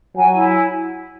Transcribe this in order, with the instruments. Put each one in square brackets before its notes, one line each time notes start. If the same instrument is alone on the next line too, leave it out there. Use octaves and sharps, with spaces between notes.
[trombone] F#3 [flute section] G#5
[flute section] E4